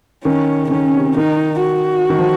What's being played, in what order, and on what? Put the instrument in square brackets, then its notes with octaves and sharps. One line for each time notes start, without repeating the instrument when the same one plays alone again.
[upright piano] D#3 [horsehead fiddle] C#4
[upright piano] C#3
[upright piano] D#3 [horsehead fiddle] C#4
[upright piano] C3
[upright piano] D#3 [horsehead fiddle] D#4
[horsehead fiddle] F#4
[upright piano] D#3
F3